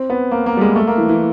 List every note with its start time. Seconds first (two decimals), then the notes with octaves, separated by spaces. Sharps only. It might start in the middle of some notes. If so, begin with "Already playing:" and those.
Already playing: C4
0.10 B3
0.31 A#3
0.46 A#3
0.57 G3
0.61 G#3
0.76 A3
0.87 A#3
0.98 E3
1.09 E3